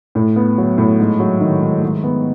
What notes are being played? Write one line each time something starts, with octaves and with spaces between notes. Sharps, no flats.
A2
B3
F#3
A2
G#2
F#3
D#3
G#2
G#2
B3